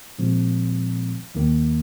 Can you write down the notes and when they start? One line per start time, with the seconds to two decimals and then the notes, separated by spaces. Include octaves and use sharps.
0.18 A#2 F3 G#3 C4
1.35 D#2 D#3 A#3